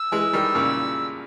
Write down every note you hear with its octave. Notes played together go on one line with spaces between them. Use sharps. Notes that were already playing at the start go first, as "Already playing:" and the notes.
Already playing: E6
E3 G#3
D#3 G3
A#2 C#3